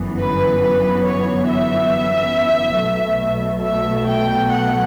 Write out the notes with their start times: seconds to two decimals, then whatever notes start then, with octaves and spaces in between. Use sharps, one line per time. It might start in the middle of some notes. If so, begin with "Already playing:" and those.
Already playing: G1 F#2 E3 B3
0.21 B4
0.64 B4
1.07 C#5
1.50 E5
2.78 B1 B2 F#3 A3
3.63 E5
4.06 G5
4.49 F#5